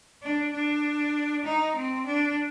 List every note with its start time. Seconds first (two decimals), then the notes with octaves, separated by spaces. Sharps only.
0.22 D4
0.53 D4
1.44 D#4
1.76 C4
2.06 D4